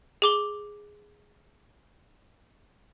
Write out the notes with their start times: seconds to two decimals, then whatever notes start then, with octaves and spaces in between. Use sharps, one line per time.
0.22 G#4 D6 G7